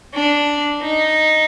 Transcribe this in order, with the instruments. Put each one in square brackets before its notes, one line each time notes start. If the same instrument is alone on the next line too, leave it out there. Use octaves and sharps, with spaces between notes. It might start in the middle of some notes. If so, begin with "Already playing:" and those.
[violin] D4
D#4